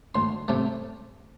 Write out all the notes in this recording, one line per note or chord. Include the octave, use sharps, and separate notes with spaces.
D2 C6
C3 A3